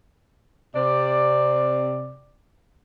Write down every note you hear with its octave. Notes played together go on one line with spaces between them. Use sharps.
C3 D5